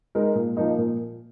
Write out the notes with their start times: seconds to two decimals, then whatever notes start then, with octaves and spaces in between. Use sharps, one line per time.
0.15 G#3 D#4 A#4
0.35 A#2
0.57 F3 A#3 D#4
0.78 A#2